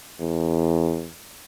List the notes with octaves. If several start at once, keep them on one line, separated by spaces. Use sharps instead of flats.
E2